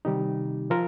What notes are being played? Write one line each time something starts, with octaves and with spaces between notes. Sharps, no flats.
C3 D#3 G3 D#4 G4
F3 F4 A#4